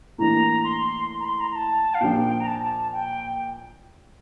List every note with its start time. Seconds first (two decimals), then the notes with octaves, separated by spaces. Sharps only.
0.18 A2 E3 A#3 D4 A#5
0.64 C6
1.20 A#5
1.25 C6
1.40 A#5
1.51 A#5
1.56 A5
1.94 F5
2.01 A#2 F3 A#3 D4 G5
2.40 A#5
2.47 A5
2.93 G5